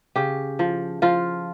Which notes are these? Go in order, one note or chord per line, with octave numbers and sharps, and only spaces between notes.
C#3 G4
F3
F3 F4